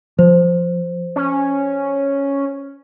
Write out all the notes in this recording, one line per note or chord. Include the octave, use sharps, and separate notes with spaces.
F3 C5
C#4